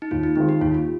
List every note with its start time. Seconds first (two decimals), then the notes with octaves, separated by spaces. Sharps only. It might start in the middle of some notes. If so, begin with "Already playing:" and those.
0.02 D#4
0.11 D#2 F4
0.23 D#4
0.36 D#3 G#3 C4 D#4 F4
0.49 G4
0.61 D#2 F4
0.75 F4